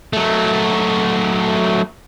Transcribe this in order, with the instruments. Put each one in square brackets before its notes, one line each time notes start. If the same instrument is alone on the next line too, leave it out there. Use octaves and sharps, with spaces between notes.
[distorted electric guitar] F#3 A3